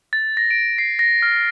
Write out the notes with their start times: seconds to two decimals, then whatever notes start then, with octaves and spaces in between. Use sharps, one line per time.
0.13 A6
0.37 A#6
0.51 D7
0.78 C7
0.99 A#6
1.22 F6